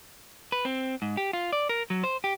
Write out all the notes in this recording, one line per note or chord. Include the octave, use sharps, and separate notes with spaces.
B4
C4
G#2
G4
F4
D5
A#4
F#3
C5
G4